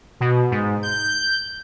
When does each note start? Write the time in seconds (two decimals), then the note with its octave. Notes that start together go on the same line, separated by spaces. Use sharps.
0.20 B2
0.51 G#2
0.83 G6